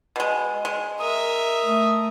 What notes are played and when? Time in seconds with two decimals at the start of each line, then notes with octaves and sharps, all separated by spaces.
0.16 B2 G#3
0.65 G#3
0.99 A#4 E5 D#6
1.63 A3